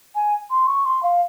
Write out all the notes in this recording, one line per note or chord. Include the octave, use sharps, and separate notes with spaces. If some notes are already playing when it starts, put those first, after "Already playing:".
G#5
C6
C#6
C6
F5